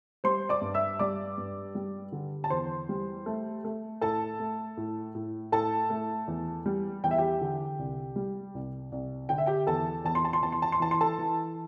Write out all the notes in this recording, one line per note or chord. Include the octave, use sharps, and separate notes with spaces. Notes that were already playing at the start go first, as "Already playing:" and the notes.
G3 C5 C6
D5 D6
G2
E5 E6
G3 D5 D6
G2
G3
D3
A5
E2 C5 C6
G3
A3
A3
A2 A4 A5
A3
A2
A2
A2 A4 A5
A3
E2
G3
E2 G5
E5
G4 G5
D3
C2
G3
C2
C2
D3 G5
E5
G4 G5
E2 A4 A5
E2 A5
C6
A5
C6
E2 A5
C6
A5
C6
E3 A5
C6
A4 A5
E3